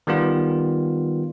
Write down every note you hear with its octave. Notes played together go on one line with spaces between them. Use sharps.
D#3 G3 B3 F4